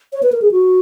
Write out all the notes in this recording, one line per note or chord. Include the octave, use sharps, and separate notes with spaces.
C#5
B4
A#4
G#4
F#4